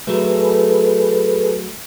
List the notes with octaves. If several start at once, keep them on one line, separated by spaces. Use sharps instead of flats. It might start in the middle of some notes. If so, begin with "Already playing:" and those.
F#3 A3 G#4 A4 B4